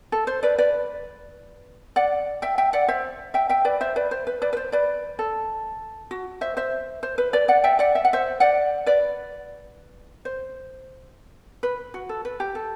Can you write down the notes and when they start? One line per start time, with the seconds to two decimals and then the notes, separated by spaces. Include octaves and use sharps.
0.12 A4
0.27 C5
0.43 B4 D5
0.58 B4 D5
1.96 D5 F#5
2.42 E5 G5
2.58 E5 G5
2.73 D5 F#5
2.88 C5 E5
3.34 E5 G5
3.49 E5 G5
3.65 B4 D5
3.81 C5 E5
3.96 B4 D5
4.11 C5
4.27 B4
4.42 B4 D5
4.53 B4
4.57 C5
4.72 B4 D5
5.19 A4
6.11 F#4
6.41 C5 E5
6.57 C5 E5
7.03 C5
7.18 B4
7.33 B4 D5
7.48 D5 F#5
7.64 E5 G5
7.79 D5 F#5
7.95 E5
8.05 F#5
8.13 C5 E5
8.40 D5 F#5
8.86 B4 D5
10.25 C5
11.63 B4
11.94 F#4
12.09 A4
12.25 B4
12.40 G4
12.55 A4